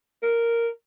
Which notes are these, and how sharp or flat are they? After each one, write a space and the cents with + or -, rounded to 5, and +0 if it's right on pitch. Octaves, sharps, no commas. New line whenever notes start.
A#4 -5